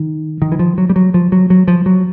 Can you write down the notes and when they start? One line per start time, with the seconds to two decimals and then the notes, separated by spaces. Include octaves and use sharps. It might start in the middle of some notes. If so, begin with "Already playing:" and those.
Already playing: D#3
0.42 D#3
0.52 E3
0.59 F3
0.78 F#3
0.89 G3
0.96 F#3
1.14 F3
1.32 F#3
1.50 F#3
1.68 F3
1.86 F#3